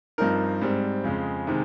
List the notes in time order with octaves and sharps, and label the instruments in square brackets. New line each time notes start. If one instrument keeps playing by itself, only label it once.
[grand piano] G2 F3 C4 D#4 A#4
G#2 G3 C4
F2 C#3 G#3
C3 D#3 G#3